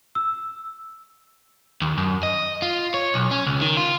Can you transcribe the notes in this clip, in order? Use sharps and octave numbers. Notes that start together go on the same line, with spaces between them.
E6
D#2
F#2
D#5
F4
C#5
B1
C#4
C#2
D#3
F4